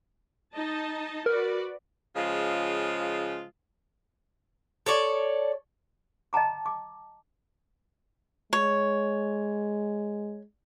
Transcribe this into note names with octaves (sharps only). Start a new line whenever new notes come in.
D#4 D#5 A5
F#4 A#4 B4 D5
C#3 F3 G#3 F4
A4 C#5 D5
D#5 G5 A5 A#5 D6
D6
G#3 C#5